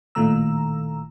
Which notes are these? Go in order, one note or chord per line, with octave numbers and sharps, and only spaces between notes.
A1 A#2 D#3 A3 A#5 E6